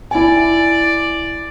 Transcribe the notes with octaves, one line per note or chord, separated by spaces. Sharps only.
E4 D5 G#5